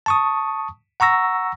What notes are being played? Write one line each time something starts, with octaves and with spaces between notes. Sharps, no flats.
A5 C#6 D#6
F#5 A#5 C#6 E6 A#6